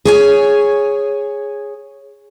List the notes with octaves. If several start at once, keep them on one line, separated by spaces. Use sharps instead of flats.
G#4 C#5 G#5